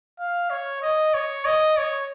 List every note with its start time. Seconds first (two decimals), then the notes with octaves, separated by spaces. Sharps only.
0.19 F5
0.50 C#5
0.82 D#5
1.14 C#5
1.45 D#5
1.77 C#5